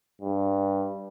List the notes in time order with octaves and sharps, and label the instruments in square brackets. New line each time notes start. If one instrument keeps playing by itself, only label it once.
[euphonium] G2